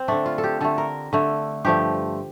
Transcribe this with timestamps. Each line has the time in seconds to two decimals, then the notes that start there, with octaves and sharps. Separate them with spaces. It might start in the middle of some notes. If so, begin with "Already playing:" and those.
Already playing: C4
0.08 D3 A3 D4
0.26 F4
0.38 A4
0.44 G4
0.60 D3 A3 A4
0.78 A#4
1.13 D3 A3
1.65 G2 F3 A3 G4